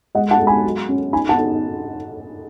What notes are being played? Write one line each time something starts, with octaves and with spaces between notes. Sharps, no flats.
G#3 D#5 F#5
F#5 A5
G#3
G#5 B5
F#3
C#4
D#4 G#5 B5
F#5 A5
D#4